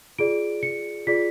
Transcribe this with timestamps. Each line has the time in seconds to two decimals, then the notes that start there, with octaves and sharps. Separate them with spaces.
0.19 F4 G#4 D5 D7
0.63 C#7
1.07 F4 G#4 D5 B6